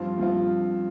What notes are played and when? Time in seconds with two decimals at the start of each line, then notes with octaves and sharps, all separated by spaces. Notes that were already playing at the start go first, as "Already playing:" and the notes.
Already playing: G2 F3 C4 F4
0.18 G2 F3 C4 F4